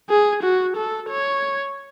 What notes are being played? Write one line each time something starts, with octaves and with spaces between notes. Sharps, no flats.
G#4
F#4
A4
C#5